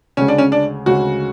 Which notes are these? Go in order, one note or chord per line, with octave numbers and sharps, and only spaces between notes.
D2 C#3 G#3 C#4
D4
C#4
D4
D2 C#3 G#3 F#4